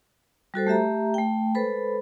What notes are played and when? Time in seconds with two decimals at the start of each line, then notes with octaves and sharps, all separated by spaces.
0.54 G3 F#4 A4 C5
0.67 A3 G4 E5 A#5
1.14 A3 G5
1.55 G#3 A4 B4 C5 B5